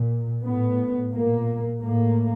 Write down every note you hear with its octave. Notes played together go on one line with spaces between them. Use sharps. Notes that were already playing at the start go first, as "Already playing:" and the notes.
Already playing: A#2
A2 B3
A#2 A#3
A2 A#3